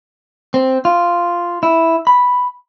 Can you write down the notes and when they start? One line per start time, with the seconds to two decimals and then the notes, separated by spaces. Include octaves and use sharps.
0.54 C4
0.85 F4
1.63 E4
2.07 B5